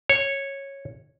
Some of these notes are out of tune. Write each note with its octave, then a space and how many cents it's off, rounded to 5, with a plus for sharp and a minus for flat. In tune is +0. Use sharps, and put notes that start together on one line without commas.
C#5 -10